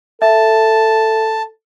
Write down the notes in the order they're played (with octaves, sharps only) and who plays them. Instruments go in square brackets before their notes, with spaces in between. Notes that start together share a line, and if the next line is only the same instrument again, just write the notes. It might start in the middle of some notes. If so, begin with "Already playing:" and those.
[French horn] A4 [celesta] E5 [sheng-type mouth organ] A5